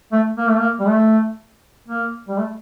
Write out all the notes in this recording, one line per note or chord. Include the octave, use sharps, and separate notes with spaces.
A3
A#3
A3
A#3
G3
A3
A#3
G3
A3